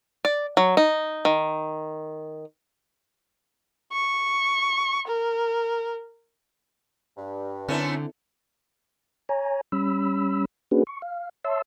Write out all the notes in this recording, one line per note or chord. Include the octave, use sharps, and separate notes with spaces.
D5
F#3
D#4
D#3
C#6
A#4
G2
F#2 D3 A3 C4 C#4 E4
C#5 G#5 A#5
G3 C#4 B5 E6
A#3 C#4 D4 F#4 G#4 B4
C#6
F5
C#5 E5 A5 C6 E6